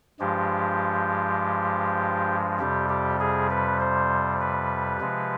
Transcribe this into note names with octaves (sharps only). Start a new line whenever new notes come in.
G2 F3 G#3 G4
F2 C3 G3 G4
G4
G#4
B4
C5
B4
C3 F3 G#3